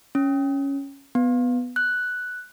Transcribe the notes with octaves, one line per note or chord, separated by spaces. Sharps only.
C#4
B3
F#6